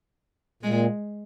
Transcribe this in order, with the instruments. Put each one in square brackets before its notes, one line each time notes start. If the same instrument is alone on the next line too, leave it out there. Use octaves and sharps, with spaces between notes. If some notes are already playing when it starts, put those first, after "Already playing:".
[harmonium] A#2 [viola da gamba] G#3